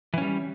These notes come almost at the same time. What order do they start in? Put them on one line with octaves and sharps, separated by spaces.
E3 C#4 G3